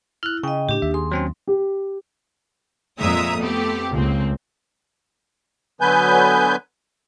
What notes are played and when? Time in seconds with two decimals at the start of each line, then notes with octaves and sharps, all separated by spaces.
0.23 E4 F6 F#6
0.43 C#3 D#5 G5
0.69 A2 D4 G4
0.82 D#2 E5
0.94 G#4 C6
1.11 F#3 C4 C#4
1.47 G4
3.00 F2 A#2 G#3 E5 A#5 D#6
3.39 A3 B3 C4 G4
3.90 C#2 A#3 C4
5.81 D3 F#3 B3 B4 G#5 G6